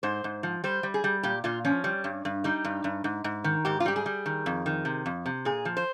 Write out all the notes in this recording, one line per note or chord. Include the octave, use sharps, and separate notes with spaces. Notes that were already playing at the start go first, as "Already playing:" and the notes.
G#2 C5
G#2
F3
G3 C5
G3
G#4
G3
A#2 G4
A#2 F4
F3 C#4
G3
G2
G2
G3 D#4
G2
G2
G#2
G#2
D#3
G#2 G4
F4
G3 G4
G#4
G3
D#3
F2
D#3
C3
F2
C3
A#2 G#4
F3
C5